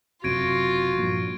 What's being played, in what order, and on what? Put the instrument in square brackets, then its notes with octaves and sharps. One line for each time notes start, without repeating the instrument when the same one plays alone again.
[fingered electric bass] F#1 F#2 C3 [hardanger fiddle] F4 [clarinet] F#4 [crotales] G#6 D7 D#7
[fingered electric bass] G2 A#2 F3